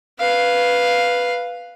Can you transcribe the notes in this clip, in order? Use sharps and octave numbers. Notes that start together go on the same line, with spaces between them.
B4 F5